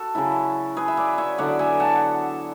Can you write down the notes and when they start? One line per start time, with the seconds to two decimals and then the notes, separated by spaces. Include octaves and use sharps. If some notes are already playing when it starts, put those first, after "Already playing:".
Already playing: F#4 A4
0.15 C#3 F#3 C#4 E4
0.77 G#4 B4
0.88 E5
0.97 B4 D5
1.18 C#5 E5
1.38 D3 F#3 B3 E4 D5 F#5
1.59 E5 G#5
1.80 F#5 A5